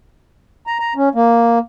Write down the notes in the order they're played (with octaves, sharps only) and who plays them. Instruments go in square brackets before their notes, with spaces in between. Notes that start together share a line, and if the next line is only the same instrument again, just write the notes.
[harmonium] A#5
A#5
C#4
A#3